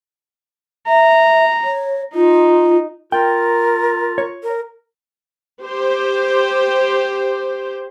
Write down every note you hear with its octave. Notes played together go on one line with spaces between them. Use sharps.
E5 A#5
C#5
D#4 F4
F4 A#4 G5
C#5
A#4
G4 C5